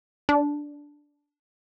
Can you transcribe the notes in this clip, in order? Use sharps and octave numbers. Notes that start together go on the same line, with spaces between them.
D4